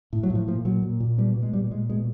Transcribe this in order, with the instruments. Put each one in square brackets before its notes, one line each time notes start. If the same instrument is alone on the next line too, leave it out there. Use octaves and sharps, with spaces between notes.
[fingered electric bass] A2
F#3
A2
F3
A#2 F3
A#2 F#3
A#2
A#2
B2 G3
B2
G#3
A#2 G3
A#2 G#3
B2 G#3